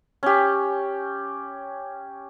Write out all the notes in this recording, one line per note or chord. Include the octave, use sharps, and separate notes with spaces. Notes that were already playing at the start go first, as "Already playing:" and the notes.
C#4 G4